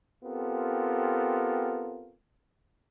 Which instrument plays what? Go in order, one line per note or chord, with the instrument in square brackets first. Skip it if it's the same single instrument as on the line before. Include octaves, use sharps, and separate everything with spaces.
[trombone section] B3 C4 F4 G4 A4 A#4